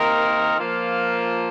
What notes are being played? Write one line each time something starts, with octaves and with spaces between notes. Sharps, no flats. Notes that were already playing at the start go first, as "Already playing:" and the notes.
Already playing: C3 D#3 A#3 D#4 A#4
F3 A#3 F4